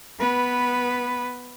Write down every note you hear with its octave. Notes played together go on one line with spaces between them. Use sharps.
B3 B4